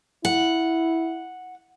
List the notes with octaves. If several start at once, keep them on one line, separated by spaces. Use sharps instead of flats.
E4 F#5